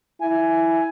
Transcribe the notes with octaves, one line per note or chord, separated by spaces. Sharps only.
E4 G#5